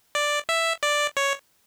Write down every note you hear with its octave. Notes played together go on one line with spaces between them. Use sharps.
D5
E5
D5
C#5